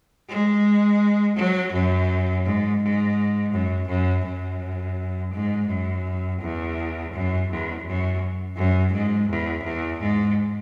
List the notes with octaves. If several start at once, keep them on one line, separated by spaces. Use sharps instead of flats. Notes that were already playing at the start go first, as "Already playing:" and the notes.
G#3
F#3
F#2
G#2
G#2
F#2
F#2
F#2
G#2
F#2
E2
F#2
E2
F#2
F#2
G#2
E2
E2
G#2